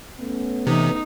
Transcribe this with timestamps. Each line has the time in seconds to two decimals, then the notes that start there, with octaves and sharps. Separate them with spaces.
0.18 A3 B3 C#4
0.67 C3 E3 D#4